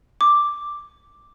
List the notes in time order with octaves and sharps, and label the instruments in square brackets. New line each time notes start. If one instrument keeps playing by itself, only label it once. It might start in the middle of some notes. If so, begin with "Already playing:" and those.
[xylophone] D6